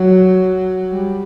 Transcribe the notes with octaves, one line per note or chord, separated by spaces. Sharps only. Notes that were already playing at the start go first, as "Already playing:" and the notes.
Already playing: F#3
G3